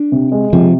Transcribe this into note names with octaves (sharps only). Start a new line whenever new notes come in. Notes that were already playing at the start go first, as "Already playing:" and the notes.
Already playing: D4
C3
G#3
C3 F3